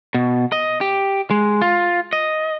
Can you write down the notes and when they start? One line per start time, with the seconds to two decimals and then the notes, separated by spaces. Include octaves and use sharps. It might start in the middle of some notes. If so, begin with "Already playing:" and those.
0.14 B2
0.52 D#5
0.81 G4
1.31 G#3
1.62 F4
2.13 D#5